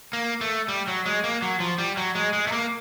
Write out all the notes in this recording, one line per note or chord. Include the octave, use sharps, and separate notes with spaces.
A#3
A3
G3
F#3
G#3
A#3
F#3
F3
G3
F#3
G#3
G#3
A3
A#3